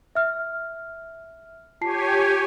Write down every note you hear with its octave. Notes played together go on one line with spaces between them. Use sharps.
E5 F6
F4 G4 C#5 G#5 A5 C7